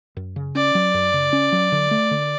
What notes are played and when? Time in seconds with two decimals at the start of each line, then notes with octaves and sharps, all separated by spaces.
0.17 F#2
0.36 C#3
0.55 C#4 D5
0.75 F#3
0.94 F#2
1.14 C#3
1.33 C#4
1.52 F#3
1.72 D3
1.91 A3
2.11 D3